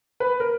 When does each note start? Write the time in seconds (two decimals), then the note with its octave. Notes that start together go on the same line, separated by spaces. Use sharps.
0.20 B4
0.40 A#4